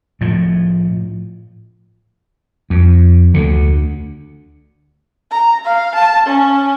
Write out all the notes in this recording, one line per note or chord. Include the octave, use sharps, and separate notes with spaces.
A2 F3
F2
D2 D3
A#5
F5
A5
C#4